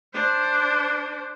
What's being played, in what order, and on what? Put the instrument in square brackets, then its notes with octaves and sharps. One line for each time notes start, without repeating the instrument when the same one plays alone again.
[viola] D4 C5